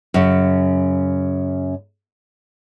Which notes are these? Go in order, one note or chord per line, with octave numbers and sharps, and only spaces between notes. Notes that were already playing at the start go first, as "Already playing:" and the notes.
F#2 C#3